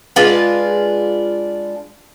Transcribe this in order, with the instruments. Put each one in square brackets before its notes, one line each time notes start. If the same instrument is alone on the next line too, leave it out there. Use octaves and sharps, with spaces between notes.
[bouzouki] G#3 D4 F4 B4